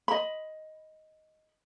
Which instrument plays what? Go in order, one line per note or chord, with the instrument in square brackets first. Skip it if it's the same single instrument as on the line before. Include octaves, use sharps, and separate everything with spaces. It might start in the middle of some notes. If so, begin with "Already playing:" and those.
[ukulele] D#5 B5